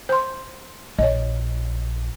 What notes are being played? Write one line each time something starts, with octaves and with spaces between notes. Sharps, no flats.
C5 C6
A#1 C#5 D#5